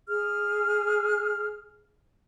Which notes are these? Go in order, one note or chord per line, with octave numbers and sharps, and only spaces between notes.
G#4 F6